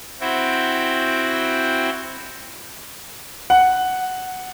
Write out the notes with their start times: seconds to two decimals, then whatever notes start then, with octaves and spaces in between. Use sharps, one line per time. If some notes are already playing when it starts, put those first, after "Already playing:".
0.20 C4 E4 F#4 G5
3.50 F#5